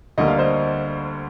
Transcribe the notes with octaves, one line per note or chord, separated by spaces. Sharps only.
D2 D3 G3 A#3 D#5
F5
C5 D#5